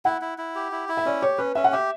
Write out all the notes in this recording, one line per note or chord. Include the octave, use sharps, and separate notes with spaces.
E4 F#5
E4
E4
G4
E4
E4
E5
C#4 D5
G4 C#5
C#4 B4
C#4 E5
F#5
G4 E5